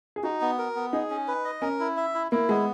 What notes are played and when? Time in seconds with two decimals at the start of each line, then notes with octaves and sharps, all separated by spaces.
0.16 G#4
0.23 D#4 F#4
0.41 B3
0.58 A#4
0.76 B3
0.93 D#4 G#4
1.10 C#4
1.28 B4
1.45 D#5
1.62 C#4 A#4
1.80 E4
1.97 E5
2.14 E4
2.32 A#3 E4
2.49 G#3 B3